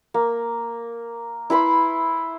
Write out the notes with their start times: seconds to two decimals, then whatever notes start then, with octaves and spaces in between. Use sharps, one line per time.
0.14 A#3
1.50 E4 B4 B5 C6